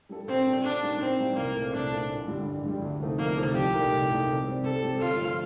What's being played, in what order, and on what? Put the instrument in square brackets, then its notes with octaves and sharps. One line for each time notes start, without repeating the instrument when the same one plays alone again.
[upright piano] G3 D4 F4 A4
[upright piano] A#2 [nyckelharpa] C4
[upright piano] G3 D4 F4 A4
[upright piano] A#2 [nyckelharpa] D4
[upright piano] G3 A#3 D#4
[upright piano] A#2 [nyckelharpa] C4
[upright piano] G3 A#3 D#4
[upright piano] C2 [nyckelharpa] A#3
[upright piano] A#2 A3 C4
[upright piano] C2 [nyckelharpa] D4
[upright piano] A#2 A3 C4
A1
G2 D3 G3
A1
G2 D3 G3
D2
C3 F3 A3 D#4
[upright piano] D2 [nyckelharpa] A#3
[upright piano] C3 F3 A3 D#4
[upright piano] C2 [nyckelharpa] G4
[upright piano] A#2 A3 D#4 A#4
C2
A#2 A3 D#4 A#4
C3
G3 C4 G4
[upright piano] C3 [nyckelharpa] A4
[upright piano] G3 C4 G4
[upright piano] G1 [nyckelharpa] F4
[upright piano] G2 F3 A3